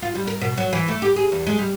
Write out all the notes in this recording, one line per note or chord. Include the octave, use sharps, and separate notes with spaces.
F4
G3
A#4
B2
F#3
E3
A3
G4
G#4
E2
G#3
G3